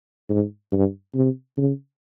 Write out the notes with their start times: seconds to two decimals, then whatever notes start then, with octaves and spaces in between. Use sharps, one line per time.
0.29 G#2
0.72 G2
1.14 C3
1.57 C#3